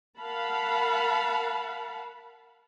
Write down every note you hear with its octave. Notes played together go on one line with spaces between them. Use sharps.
A#4 F5 F#5 A5 B5